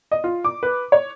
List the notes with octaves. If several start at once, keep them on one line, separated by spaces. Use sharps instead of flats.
D#5
F4
D6
B4
C#5